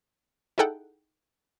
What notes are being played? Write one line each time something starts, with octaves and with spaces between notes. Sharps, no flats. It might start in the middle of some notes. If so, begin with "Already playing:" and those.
D#4 E4 G#4 A4 F#5 G5